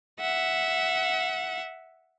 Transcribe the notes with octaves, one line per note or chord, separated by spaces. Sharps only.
E5 F#5